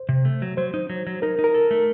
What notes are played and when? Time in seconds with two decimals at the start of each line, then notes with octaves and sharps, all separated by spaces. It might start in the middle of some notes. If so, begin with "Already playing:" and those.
Already playing: C5
0.09 C3
0.25 A3
0.42 F#3
0.57 F#3 C5
0.74 D#4
0.90 F#3
1.07 F#3
1.22 D#4 A#4
1.39 D#4
1.44 A#4
1.54 A4
1.71 A3